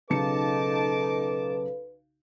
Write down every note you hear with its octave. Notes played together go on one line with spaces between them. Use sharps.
B1 C#3 D#4 A4 B4 A5 D6 C#7